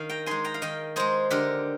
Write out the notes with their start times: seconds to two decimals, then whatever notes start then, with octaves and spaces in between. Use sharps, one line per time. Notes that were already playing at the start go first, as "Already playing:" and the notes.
Already playing: D#3 A#4 F5
0.09 G5 A#5
0.26 G#3 D#4 G#5 C6
0.44 G5 A#5
0.54 F5
0.62 D#3 D#5 G5
0.96 G#3 D#4 G#4 C5
1.31 D3 G4 A#4